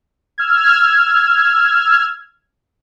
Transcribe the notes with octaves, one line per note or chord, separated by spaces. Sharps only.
E6 F6 G#6